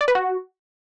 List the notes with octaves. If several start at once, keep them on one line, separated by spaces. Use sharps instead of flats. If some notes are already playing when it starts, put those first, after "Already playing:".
D5
B4
F#4